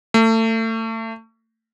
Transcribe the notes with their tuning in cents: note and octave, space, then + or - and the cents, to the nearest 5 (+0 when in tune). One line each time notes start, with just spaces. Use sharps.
A3 +30